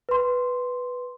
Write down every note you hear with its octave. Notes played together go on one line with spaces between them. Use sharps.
B4 C6